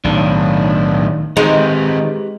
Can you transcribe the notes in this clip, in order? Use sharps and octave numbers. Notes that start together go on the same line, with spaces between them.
B1 A2 D#3 D4
D#3 G#3 C4 D#4 G4 B4 A#5